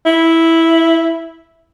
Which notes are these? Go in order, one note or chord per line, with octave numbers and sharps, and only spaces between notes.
E4